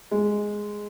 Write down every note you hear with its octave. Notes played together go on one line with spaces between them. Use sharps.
G#3